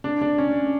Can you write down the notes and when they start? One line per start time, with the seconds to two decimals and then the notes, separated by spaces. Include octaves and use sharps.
0.04 D4
0.22 D4
0.38 C#4